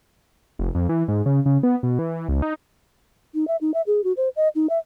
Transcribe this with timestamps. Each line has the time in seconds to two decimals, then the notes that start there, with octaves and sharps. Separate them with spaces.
0.59 F1
0.75 F2
0.89 E3
1.08 G#2
1.26 C#3
1.46 C#3
1.63 B3
1.83 B2
1.99 E3
2.28 C#2
2.42 D#4
3.34 D#4
3.48 E5
3.61 D#4
3.74 E5
3.87 G#4
4.04 F#4
4.17 C5
4.36 D#5
4.55 D#4
4.70 E5